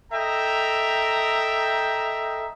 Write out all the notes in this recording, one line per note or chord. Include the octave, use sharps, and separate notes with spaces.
A4 D#5 E5 G5 A#5